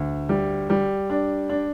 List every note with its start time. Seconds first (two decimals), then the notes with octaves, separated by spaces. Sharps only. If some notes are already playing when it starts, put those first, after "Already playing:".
Already playing: D2
0.29 G3
0.70 G3
1.10 D4
1.49 D4